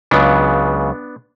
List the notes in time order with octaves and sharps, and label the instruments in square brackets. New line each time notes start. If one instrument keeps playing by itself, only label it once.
[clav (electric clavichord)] C#2 C#3 F#3 B3 D4